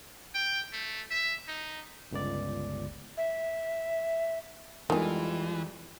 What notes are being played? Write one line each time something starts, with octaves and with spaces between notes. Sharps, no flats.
G5
A3
E5
D#4
G1 C#2 D5
E5
F2 D#3 E3 G3 G#3 F4 G#5